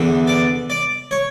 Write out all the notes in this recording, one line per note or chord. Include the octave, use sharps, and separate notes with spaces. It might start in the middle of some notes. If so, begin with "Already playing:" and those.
Already playing: E2 D3
D5
D5
C#5